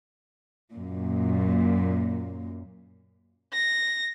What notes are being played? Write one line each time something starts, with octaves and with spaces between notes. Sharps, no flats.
F#2 A#2
A#6